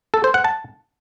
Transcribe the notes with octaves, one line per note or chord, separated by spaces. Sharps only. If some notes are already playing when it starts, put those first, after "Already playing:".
A4
C5
F#5
A5